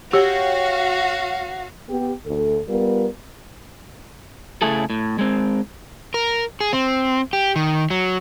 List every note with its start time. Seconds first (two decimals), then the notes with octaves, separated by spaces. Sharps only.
0.13 F#4 G4 C#5 F5 G5
1.89 B3 G4
2.26 D2 A4
2.68 G3 B3 F4 A#4
4.62 C#3 A3 E4 G#4 A4
4.90 A2
5.19 G#3 C4
6.14 A#4
6.61 G#4
6.73 C4
7.33 G4
7.56 D#3
7.90 F#3